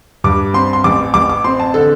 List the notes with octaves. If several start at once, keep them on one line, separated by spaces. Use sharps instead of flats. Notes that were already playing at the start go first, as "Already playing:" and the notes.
G2 D6
C4 C6
C6
A1 D6
A1 D6
D6
C4 C6
A5
D3 A4